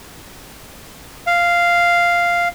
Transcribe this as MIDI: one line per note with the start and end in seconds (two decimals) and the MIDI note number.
1.27 2.48 77